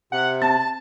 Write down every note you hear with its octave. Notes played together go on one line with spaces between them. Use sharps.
C3 F#5
C4 A5